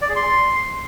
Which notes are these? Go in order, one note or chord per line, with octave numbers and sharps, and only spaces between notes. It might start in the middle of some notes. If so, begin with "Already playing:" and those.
D5
G#4
C6